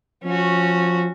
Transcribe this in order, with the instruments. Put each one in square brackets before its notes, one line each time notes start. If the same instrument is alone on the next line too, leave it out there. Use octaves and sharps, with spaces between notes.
[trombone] F3 [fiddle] C#4 F#4